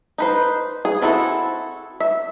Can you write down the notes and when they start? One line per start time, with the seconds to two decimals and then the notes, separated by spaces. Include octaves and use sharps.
0.18 D#4 B4 C5
0.85 G#4
1.02 C4 D4 E4 F#4 A4
2.00 E5